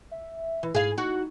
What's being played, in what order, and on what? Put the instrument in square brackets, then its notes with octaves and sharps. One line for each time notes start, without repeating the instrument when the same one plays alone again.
[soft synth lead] E5
[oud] E3
[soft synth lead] G#2 [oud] G#4 F5
[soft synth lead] D#4 [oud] F#4